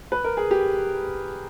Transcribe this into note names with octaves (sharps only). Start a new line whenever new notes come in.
B4
A#4
G#4
G4